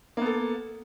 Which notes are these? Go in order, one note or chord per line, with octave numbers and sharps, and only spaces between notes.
A#3 B3 A4